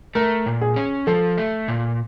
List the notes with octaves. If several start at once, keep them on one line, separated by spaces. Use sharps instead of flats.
A3 A#4
A#2
G#4
C#4
F3 A4
A3
A#2